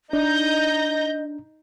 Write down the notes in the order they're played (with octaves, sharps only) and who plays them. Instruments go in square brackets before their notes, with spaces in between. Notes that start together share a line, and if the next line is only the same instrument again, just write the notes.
[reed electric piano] D4 [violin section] D#4 G6 A#6 [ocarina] D#5